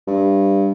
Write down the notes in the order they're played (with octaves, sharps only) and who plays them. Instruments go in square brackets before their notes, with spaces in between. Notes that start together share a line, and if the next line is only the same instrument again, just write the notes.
[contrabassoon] G2